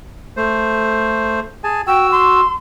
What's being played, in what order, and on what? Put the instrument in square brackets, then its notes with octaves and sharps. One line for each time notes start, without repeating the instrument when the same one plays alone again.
[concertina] A3 C5
G#4 G#5 A5
[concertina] F#4 E6 [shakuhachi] G5
[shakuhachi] C6